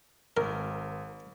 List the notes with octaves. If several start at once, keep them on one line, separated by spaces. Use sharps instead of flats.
G#1 A#4